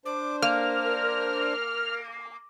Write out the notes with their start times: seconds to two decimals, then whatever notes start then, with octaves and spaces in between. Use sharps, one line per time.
0.06 D4 C5 D6
0.42 A#3 A#4 F6